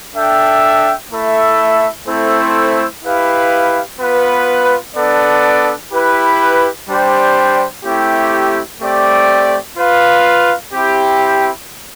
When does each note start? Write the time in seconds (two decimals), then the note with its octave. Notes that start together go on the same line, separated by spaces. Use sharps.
0.15 D4 A4 E5 G5
1.11 A3 E4 A4 E5
2.07 A3 C4 E4 A4 C5
3.03 E4 G4 B4 F5
3.99 B3 F4 B4
4.96 B3 D4 A4 D5
5.92 E4 G4 B4
6.89 G3 D4 G4 C5
7.84 A3 C4 E4 G4
8.80 A3 C4 G4 D5
9.77 F4 B4 F5
10.72 C4 E4 G4